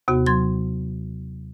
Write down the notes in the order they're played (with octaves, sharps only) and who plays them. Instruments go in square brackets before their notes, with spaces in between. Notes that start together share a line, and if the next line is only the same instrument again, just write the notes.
[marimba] D#2 C3 B3 F#4
F#3 C6 G#6